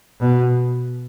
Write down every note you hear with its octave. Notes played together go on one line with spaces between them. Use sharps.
B2